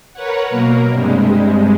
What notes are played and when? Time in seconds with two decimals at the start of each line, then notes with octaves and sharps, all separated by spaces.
0.13 A#4 B4 C#5 F#5
0.50 B2 F#3 A#3 A#4
0.92 G2 C3 G3 G#3